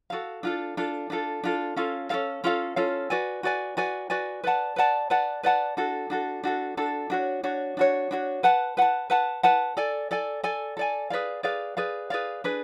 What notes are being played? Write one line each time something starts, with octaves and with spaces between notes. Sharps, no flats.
F#4 A4 F5
D4 F4 A4
D4 F4 A4
D4 F4 A4
D4 F4 A4
C#4 F4 A4 F5
C#4 F4 A4 F5
C#4 F4 A4 F5
C#4 F4 A4 F5
F#4 B4 D5 G#5
F#4 B4 D5 G#5
F#4 B4 D5 G#5
F#4 B4 D5 G#5
B4 D5 F#5 A5
B4 D5 F#5 A5
B4 D5 F#5 A5
B4 D5 F#5 A5
D4 F#4 A4
D4 F#4 A4
D4 F#4 A4
D4 F#4 A4
D4 F#4 C#5
D4 F#4 C#5
D4 F#4 C#5
D4 F#4 C#5
B4 F#5 A5
B4 F#5 A5
B4 F#5 A5
B4 F#5 A5
A4 D5 G#5
A4 D5 G#5
A4 D5 G#5
A4 D5 G#5
G#4 B4 D5 F5
G#4 B4 D5 F5
G#4 B4 D5 F5
G#4 B4 D5 F5
D4 G#4 B4